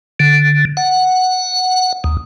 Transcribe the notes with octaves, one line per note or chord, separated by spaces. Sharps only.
D3
F#5
D#2